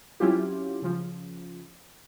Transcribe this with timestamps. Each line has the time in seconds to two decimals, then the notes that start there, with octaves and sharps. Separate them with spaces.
0.20 F#3 C4 C#4 E4 F4 G4
0.82 C#3 F3